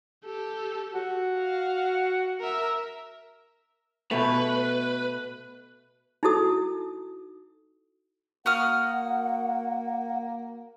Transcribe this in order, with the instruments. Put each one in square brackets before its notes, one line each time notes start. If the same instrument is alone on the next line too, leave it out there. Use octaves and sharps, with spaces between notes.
[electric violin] G4 A4
[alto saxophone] F#4
[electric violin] F5
A#4 E5
[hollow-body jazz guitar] B2 A3 [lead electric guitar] B4
[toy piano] D#4 E4 F#4 A4 D#6
[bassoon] A#3 [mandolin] F#4 D#6 F6 [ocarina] F#5